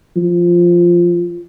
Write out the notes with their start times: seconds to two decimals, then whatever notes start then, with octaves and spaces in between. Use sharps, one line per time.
0.16 F3